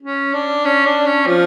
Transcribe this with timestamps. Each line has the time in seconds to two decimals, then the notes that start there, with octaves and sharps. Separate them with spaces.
0.02 C#4
0.34 D4
0.65 C#4
0.85 D4
1.06 C#4
1.27 F3